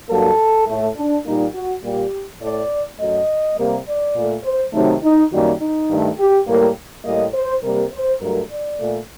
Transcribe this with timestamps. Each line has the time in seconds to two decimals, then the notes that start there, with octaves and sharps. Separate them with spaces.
0.09 G2 F#3 A#3 A4
0.67 A2 A3
0.96 D4
1.25 A#2 G3 A#3 D#4
1.54 F#4
1.83 A#2 G3 A#3 G4
2.41 A2 A3 D5
2.99 F#2 F#3 A3 D#5
3.57 C3 G3 A#3
3.86 D5
4.15 A#2 A3
4.44 C5
4.73 C3 D#3 F#3 A3 D#4
5.02 D#4
5.31 F#2 D#3 G3 A#3 F#4
5.60 D#4
5.89 G2 D#3 A3
6.18 G4
6.47 A2 G3 A#3
7.05 A2 G3 A#3 D#5
7.34 C5
7.62 C3 G3 A#3 A#4
7.92 C5
8.20 G2 F#3 A3 A#4
8.50 D5
8.79 A#2 A3